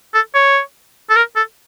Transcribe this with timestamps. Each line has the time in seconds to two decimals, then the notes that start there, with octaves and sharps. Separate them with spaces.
0.14 A4
0.35 C#5
1.10 A4
1.16 A#4
1.36 A4